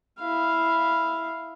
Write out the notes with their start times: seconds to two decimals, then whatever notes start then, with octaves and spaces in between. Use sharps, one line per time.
0.19 E4 F5